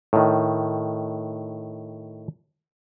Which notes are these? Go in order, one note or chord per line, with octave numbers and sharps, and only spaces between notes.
A2 D#3